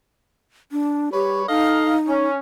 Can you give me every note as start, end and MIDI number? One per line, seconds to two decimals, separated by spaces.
0.72 1.09 62
1.13 1.47 55
1.13 1.43 67
1.13 1.47 71
1.13 1.47 73
1.49 2.27 63
1.49 1.96 69
1.49 1.96 75
1.49 1.96 77
2.08 2.39 61